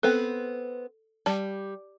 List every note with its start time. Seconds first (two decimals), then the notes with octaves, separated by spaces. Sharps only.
0.03 B3 C4 A4
1.26 G3 A5